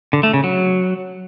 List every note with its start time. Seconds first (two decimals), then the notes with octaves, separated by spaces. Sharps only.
0.13 D3
0.23 A3
0.34 C#3
0.44 F#3